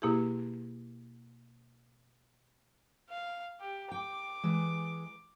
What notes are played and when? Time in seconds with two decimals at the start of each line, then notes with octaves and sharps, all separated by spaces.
0.02 B2 A#3 E4 G4 G#4
3.10 F5
3.60 G4
3.91 G5 D6
4.44 E3 G#3